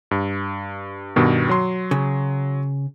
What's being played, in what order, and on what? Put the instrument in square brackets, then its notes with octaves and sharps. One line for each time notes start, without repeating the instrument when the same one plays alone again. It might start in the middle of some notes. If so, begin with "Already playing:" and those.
[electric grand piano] G2
G2 B2 D#3
F#3 C6
[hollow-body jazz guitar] C#3